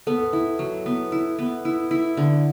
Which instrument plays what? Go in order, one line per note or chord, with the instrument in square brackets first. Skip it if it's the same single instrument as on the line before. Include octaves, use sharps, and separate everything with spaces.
[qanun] B3 [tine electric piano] A4
[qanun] E4
F#3
B3
E4
B3
E4
E4
D3